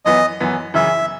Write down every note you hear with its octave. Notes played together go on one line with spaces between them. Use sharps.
F#2 E3 B3 D#5
F#2 E3 B3
F#2 C#3 E3 E5